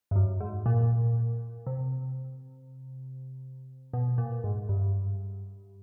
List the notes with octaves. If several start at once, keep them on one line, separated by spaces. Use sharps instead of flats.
G2
F#2
G#2
A#2
C3
B2
A#2
G#2
G2